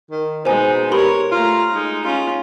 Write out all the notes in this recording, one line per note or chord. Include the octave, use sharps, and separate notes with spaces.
D#3
B2 G#3 D#4 C5 G#5
G4 A#4 C#5 B5 C6
A3 F4 A#5
G#3 D#4
C#4 F4